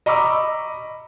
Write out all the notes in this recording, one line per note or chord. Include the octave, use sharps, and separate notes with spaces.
D#5 A#5 B5 C#6 D6 E6